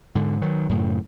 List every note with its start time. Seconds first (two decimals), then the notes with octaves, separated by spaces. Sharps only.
0.15 G#2 D3
0.41 D#3 F#3
0.69 F#2 A2 C#3